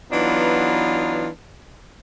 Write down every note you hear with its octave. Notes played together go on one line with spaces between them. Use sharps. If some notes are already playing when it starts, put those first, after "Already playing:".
E3 F#3 B3 D4 D#4 F4